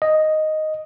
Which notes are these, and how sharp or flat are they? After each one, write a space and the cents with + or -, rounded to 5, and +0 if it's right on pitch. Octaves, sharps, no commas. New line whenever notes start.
D#5 +0